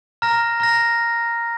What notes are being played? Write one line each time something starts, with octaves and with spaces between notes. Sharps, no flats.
A#5 F6 A#6
A#5 F6 A#6